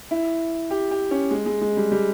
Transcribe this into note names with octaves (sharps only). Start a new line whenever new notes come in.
E4
G4
G4
C#4
G#3
G#3
G#3
G3
G3